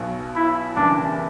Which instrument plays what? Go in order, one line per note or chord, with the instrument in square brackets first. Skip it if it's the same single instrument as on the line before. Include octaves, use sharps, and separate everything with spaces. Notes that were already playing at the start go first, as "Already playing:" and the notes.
Already playing: [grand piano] B1 B2 F#3
[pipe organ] E4
[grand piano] F#1 E2 C#3 G3 B3 [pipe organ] D4